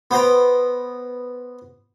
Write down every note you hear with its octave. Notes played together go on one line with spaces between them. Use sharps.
B3 C5 G5 A#5